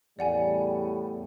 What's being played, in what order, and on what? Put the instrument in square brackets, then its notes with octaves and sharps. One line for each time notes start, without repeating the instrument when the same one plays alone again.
[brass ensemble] E2 A2 G3 [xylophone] D5 F#5 G#5